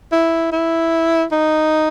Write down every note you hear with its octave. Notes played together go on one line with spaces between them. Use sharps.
E4
E4
D#4